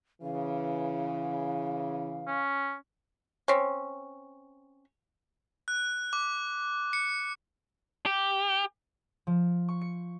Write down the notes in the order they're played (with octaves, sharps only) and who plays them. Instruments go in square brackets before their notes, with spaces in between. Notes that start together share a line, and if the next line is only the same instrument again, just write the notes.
[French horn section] C#3 E3 [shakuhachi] F5
[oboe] C#4
[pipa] C4 C#4
[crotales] F#6
D6
C#7
[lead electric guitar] G4
[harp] F3
C#6
C#7